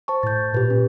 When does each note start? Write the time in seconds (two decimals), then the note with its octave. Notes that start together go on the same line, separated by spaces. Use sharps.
0.08 C5 A5 C#6
0.23 A2 G6 A6
0.54 A#2 G4 B4
0.70 C#4